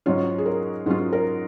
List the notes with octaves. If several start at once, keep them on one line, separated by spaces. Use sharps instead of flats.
G#2 F#3 C#4 F4 C#5
G#4
A#4
G#2 F#3 C#4 F4 G#4
A#4